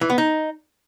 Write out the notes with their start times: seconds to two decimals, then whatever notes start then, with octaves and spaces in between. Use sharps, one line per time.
0.01 E3
0.10 B3
0.18 D#4